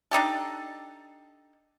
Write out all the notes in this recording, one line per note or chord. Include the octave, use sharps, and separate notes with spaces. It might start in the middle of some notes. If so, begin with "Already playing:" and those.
D4 D#4 G4 A4